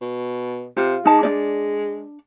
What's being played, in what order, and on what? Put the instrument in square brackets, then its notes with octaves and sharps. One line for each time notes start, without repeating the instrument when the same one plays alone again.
[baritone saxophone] B2
[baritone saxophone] C3 [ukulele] F4
[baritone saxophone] G#3 [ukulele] D#4 A5
[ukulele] D4 D#4 D5